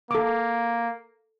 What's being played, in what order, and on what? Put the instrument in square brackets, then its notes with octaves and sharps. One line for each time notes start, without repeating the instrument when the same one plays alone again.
[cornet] A#3 [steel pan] A4 D6